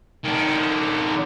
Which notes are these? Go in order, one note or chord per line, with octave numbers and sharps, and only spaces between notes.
D#3 D4